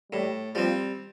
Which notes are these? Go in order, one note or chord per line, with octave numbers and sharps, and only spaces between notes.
A2 G3
F3 G3 C4